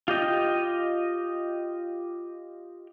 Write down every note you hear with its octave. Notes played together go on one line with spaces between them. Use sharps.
F4 G4 D#5 G5